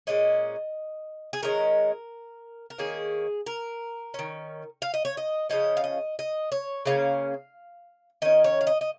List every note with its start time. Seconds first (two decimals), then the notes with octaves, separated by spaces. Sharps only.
0.07 A#2 F3 G#3 C#4 D#5
1.33 G#4
1.42 D#3 G#3 C#4 A#4
2.70 A#4
2.78 D#3 A#3 C#4 G#4
3.46 A#4
4.14 D#3 C#4
4.82 F5
4.94 D#5
5.05 C#5
5.17 D#5
5.50 C#3 F3 C#4 D#5
5.77 F5
5.84 D#5
6.19 D#5
6.52 C#5
6.86 C#3 A#3 C#4 F5
8.22 D#3 C#4 D#5
8.44 C#5
8.61 F5
8.67 D#5
8.81 D#5